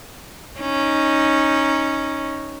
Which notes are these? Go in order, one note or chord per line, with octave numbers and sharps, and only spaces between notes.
C#4 D#4